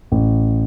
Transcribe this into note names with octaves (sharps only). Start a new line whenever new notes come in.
A1